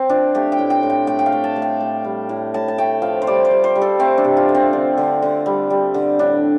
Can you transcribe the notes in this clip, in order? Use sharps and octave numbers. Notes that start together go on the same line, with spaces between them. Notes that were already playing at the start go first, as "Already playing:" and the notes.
Already playing: C4
F3 D4
A3 G4
G5
A2
G5
A2
G5
A3 G5
G5
F5
A3
A5
A3
G5
A2
G3
A2
A2 A5
A5
A3 G5
F3 F5
C5
G3 D5
C5
G3
C5
G3
A4
A3 C4
D4
C3
F4
A3
C4
D3
D3
D3
G3
G3
D3
A2 D4